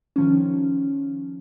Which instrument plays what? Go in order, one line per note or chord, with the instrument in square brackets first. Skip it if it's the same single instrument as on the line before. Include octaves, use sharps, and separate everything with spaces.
[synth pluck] D#3 F3 C#4